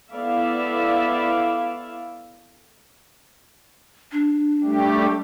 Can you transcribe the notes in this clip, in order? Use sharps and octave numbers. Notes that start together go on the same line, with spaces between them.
B3 E4 A4 D5 E5 F5
D4
G3 A3 G4